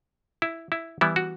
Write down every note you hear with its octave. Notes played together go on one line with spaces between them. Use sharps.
E4
E4
E3 G3 B3 E4
F#4